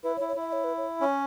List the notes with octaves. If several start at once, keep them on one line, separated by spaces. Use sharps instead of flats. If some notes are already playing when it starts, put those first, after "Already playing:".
E4 B4
C#5
E4
C#5
E4 E5
C#5
B4
C#5
C#4 C#5